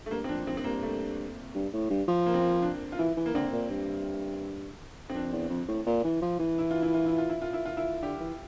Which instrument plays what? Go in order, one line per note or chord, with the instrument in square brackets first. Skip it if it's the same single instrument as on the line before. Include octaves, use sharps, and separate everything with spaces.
[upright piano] A3
[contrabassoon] G2 [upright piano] A#3
[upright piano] C4
[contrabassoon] F2 [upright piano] D4
[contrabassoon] F2 [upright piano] C4
[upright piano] C4
[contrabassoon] G2 [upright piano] A#3
[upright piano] A3
[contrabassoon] G2
A2
G2
F3
[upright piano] A#3
C4
A#3
D4
F4
[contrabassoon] E3 [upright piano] E4
[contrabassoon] E3
[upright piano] A#3
[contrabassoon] D3 [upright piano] C4
[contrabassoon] A#2
G2
[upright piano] C4
[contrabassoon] F2 [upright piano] D4
[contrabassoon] E2
F2
A2
A#2
E3
F3
E3
[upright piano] E4
F4
E4
F4
E4
F4
E4
F4
E4
F4
E4
[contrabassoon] D3 [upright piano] G4
[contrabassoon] E3